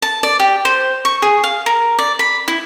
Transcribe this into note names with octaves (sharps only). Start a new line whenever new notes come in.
A5
D5
G4
C5
C#6
G#4
F5
A#4
D5
B5
E4